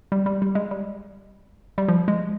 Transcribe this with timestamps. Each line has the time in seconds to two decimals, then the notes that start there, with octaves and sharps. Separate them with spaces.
0.12 G3
0.26 G3
0.42 G3
0.55 G#3
0.71 G3
1.78 G3
1.88 F3
2.08 G#3